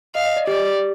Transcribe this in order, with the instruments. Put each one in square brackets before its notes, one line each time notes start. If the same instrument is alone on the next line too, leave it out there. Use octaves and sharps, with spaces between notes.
[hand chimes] D#5 [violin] F5
[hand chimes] D#5
D5
[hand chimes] G4 [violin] D5